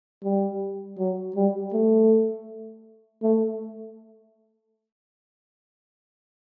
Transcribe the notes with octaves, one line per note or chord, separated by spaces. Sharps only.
G3
F#3
G3
A3
A3